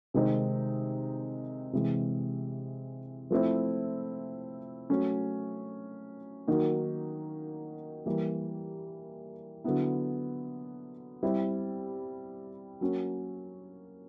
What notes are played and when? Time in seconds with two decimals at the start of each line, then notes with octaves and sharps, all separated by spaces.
0.14 C3 D#3 G#3 C4 D#4
1.73 C3 E3 G#3
3.31 F3 A3 C4 E4
4.90 F#3 A3 C#4
6.47 D#3 F#3 A#3 D#4 F#4
8.06 E3 G3 A#3
9.64 D3 F#3 B3 E4
11.23 G3 C4 E4
12.81 F#3 A#3 C#4